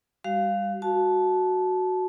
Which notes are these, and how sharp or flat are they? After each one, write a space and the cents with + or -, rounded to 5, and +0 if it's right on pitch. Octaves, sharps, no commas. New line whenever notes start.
G3 +35 F#4 +40 F5 +0
F#4 +0 A5 -15